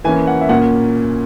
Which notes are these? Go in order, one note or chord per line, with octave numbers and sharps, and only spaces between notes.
E3 A#3 C#4 G#5
F#5
E5
A#2 A#3 C#4 F#5